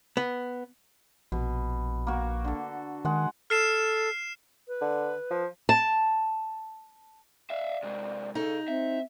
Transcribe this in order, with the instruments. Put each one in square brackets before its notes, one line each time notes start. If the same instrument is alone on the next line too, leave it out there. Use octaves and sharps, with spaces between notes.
[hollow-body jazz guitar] B3
[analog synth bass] A#1 [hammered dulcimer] B2
[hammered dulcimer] A#3 F#4
D3 A4
[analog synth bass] D#3 [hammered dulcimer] G#3 F#5
[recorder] A4 [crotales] F6 C7 E7
[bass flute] B4
[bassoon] D3
F3
[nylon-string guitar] A5
[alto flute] D5 [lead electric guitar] E5 F5
[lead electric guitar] C3 G#3
[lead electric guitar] D2 C#3 [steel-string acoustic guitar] D#4 [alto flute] A4
[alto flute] C4 [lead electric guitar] E5